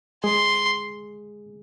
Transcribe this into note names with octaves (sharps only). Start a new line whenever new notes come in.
G#3 G#4 C6